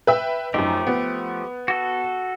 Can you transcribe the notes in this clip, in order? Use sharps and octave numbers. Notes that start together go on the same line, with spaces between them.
B4 E5 G5
F#2 F3 A3 D#4 G4
B3
F#4 A4